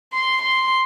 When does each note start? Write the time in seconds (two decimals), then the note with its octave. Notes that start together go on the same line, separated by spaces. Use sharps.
0.13 C6
0.42 C6